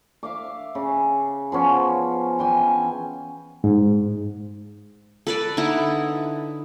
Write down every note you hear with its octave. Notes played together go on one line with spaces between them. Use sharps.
E5 F5 D6
C#3
F3 B3 C#4
E3 G5 G#5
G#2
A4 B4 D5
D3 D#4 E4